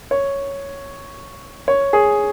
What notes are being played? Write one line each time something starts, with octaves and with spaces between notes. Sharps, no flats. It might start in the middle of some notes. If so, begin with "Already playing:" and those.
C#5
C#5
G#4